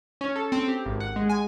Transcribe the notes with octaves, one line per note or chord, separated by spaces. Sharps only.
C#4
A4
C4
G4
G#1
F#5
G#3
G#5